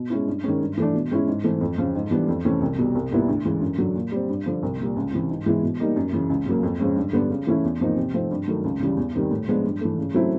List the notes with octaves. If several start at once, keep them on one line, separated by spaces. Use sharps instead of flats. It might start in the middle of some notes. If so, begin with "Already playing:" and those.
Already playing: B2
G#3 C#4 E4
G2
D#3 G#3 C#4
G2
E3 A3 D4
B2
G#3 C#4 E4
G#2
E3 A3 C4
F2
C#3 F3
G#2
E3 G3 B3 D4
F2
C3 E3 A3 C#4
C2
B2 G3
C2
A#2 G3 B3 E4
D2
C#3 E3 G#3
F#2
D3 F#3
A#2
G3 C4
G2
D3 F3
C2
A#2 G3
C#2
C3 E3
G#2
E3 G#3 B3 E4
B2
G3 A#3 D#4
F#2
C#3 E3
C#2
C#3 F#3 A#3
F2
C#3 F3 G#3 C#4
G2
D3 G3 B3
C#3
E3 A3 C#4 E4
E2
C3 F3 A#3 D#4
C3
F3 A3 C4 D#4
G2
D#3 F#3 A3
C#2
C#3 E3 G3
E2
C3 D#3 G3
A2
F3 G#3 B3 D4
G2
E3 A3
C#3
F#3 A3 C4 E4